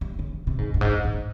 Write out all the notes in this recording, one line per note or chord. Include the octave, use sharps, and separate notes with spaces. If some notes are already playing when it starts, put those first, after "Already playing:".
G3
G#3
C3
C3
G#2
G2
G#2
G#2